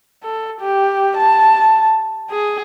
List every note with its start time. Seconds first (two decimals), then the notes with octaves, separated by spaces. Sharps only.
0.23 A4
0.61 G4
1.17 A5
2.30 G#4